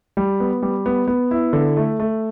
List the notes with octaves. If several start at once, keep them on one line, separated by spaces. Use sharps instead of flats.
G3
B3
G3
B3
B3
E4
D3
A3
A3